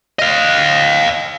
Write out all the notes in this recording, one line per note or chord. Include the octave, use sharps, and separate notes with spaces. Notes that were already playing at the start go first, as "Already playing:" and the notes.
D#5 F5